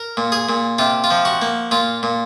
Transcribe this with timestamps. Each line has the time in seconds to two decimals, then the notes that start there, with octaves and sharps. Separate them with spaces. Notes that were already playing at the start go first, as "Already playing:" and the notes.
Already playing: A#4
0.17 A#2
0.32 G#4
0.49 A#2
0.79 C3 F4
1.04 F4
1.11 F3
1.25 F#4
1.42 A#3
1.71 A#2 F4
2.03 A#2